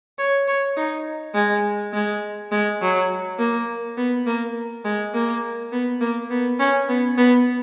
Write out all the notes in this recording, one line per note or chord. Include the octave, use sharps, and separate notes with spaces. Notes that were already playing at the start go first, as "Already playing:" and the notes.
C#5
C#5
D#4
G#3
G#3
G#3
F#3
A#3
B3
A#3
G#3
A#3
B3
A#3
B3
C#4
B3
B3